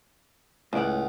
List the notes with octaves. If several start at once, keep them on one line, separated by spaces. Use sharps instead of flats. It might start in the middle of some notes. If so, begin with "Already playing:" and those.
C#2 A2 D5 F#5